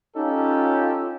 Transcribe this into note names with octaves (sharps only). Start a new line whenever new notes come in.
C#4 D#4 F4 G4 A4